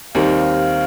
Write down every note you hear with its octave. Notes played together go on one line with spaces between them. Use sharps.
D#2 D#3 G3 C4 D#4 F5